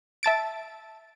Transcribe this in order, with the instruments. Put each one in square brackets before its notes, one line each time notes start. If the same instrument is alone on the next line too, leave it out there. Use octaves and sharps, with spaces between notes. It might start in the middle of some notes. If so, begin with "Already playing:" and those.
[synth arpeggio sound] E5 A5 A6 D7